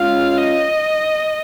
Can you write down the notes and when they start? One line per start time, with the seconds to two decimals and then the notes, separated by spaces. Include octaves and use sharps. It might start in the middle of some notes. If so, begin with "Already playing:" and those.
Already playing: G#3 C#4 F4 F5
0.38 D#5